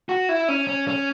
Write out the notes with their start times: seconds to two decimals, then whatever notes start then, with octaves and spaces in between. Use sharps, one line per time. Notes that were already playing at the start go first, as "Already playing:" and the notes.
0.09 F#4
0.29 E4
0.48 C#4
0.67 C#4
0.88 C#4